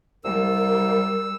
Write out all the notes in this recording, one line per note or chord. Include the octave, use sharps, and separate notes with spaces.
C2 G3 A#4 E6